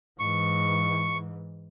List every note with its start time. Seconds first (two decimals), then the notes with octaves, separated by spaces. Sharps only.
0.20 G#2 E3 C#6